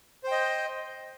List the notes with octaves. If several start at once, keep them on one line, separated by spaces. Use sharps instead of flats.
C5 D#5 G5